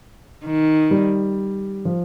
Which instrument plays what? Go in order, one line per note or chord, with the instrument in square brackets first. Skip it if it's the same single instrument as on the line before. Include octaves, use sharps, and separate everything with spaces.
[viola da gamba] D#3
[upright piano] G3
F3